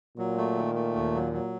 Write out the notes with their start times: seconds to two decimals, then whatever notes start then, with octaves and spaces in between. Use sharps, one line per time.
0.17 A#2 F#3
0.38 A3
0.57 D#3
0.75 A3
0.95 D#2
1.14 F#3
1.33 F#3